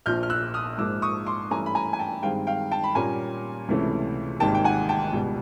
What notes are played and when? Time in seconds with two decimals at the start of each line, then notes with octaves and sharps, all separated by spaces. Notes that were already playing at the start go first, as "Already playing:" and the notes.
0.06 A#1 A#2 F3 F6 G6
0.23 F6
0.30 E6 F#6
0.54 D#6 F6
0.78 G#2 F3 A#3 D6 E6
1.02 C#6 D#6
1.26 C6 D6
1.51 G2 E3 A3 C#4 G#5 A#5
1.66 B5
1.75 G#5 A#5
1.93 G#5
1.99 G5 A5
2.23 G2 D#3 G#3 C4 F5 G5
2.47 F5 G5
2.71 G5 A5
2.84 B5
2.95 A#2 G3 A#3 C#4 G#5 A#5
3.68 C#2 C3 E3 A3 C#4
4.40 G#1 G#2 D#3 G3 A#3 G5 A5
4.55 G5
4.64 F#5 G#5
4.89 G5 A5
5.13 C#2 B2 G3